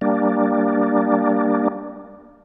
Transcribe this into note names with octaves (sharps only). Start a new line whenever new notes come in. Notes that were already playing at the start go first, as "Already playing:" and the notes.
G3 A#3 D4